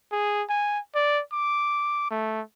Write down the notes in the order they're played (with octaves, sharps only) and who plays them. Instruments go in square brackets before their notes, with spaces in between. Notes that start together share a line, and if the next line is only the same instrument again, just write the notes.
[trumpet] G#4
G#5
D5
D6
A3